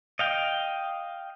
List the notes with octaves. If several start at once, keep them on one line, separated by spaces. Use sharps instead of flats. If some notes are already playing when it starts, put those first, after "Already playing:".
D#5 F5 G5